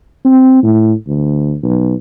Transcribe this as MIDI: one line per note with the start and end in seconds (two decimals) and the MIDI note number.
0.25 0.62 60
0.63 0.93 45
1.07 1.55 38
1.63 1.93 35